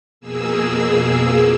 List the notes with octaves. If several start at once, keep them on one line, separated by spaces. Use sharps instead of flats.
F2 B2 A#3 G#4 E6